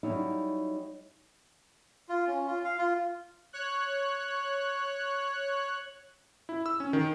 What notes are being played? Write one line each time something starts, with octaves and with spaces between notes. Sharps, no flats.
F#3 G3 C#4 D#4 E4
F4
C#4
F4
F5
F4
C#5 F#6
E4
E6
C#4
D#3